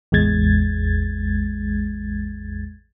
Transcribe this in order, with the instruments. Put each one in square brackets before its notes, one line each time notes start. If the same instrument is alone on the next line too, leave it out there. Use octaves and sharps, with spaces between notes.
[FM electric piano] A1 E2 G#3 G#6 A6